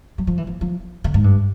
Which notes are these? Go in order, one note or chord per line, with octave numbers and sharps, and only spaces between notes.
F#3
F3
E3
F3
F3
D3
G#2
G2